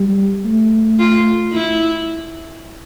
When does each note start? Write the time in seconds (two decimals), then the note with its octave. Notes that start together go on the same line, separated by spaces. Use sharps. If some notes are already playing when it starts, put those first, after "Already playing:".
Already playing: G3
0.45 A3
0.99 F4
1.53 E4